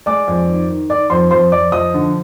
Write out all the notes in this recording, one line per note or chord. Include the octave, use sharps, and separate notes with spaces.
G#3 D5 D6
F2
D#3
D#3
D#3 D5 D6
F2 C5 C6
F2 C5 C6
F2 D5 D6
F3 D#5 D#6
D3